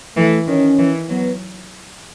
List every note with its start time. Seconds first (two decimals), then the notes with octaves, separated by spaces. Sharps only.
0.17 E3 A3
0.47 D#3 C#4
0.78 E3
1.09 F#3 B3